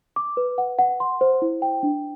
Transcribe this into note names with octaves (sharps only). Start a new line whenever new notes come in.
D6
B4
F#5
F#5
C6
C5
E4
G5
D4